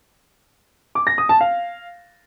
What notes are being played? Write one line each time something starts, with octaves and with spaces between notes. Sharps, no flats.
D6
A#6
D#6
A5
F5